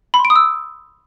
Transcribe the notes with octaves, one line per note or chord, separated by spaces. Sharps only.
B5
C6
D7
D#6
E6